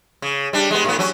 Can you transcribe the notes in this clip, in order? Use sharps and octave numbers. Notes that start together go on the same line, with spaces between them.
C#3
G3 D4
G#3 B3
A2 B3
F#3 C#4